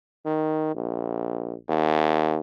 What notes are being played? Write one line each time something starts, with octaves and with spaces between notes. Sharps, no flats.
D#3
A#1
D#2